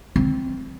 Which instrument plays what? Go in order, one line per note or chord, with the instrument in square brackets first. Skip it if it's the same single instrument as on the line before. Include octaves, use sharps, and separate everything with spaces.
[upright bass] C4